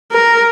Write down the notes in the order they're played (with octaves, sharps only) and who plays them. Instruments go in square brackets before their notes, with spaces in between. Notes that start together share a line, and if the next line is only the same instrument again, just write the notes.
[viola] A#4